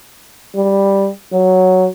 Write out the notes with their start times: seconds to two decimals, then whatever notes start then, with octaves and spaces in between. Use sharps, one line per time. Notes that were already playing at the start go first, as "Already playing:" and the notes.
0.56 G3
1.32 F#3